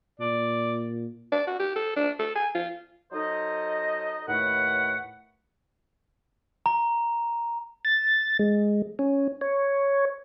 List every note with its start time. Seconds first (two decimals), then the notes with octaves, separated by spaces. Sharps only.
0.20 A#2 D5
1.32 D5
1.47 F#4
1.59 G4
1.76 A4
1.96 D4
2.19 A4
2.35 G#5
2.55 F4
3.13 F#3 D#4 A4 C5 D#5
4.28 D#2 A2 A3 B4 F#5
6.66 A#5
7.85 A6
8.39 G#3
8.99 C#4
9.41 C#5